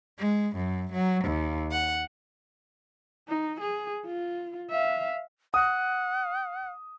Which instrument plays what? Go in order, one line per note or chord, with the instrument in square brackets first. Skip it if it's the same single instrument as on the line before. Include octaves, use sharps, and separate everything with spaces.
[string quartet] G#3
F#2
F#3
D#2
F#5
[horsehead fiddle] D#4
G#4
F4
E5 F5
[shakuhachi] F#5 [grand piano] D#6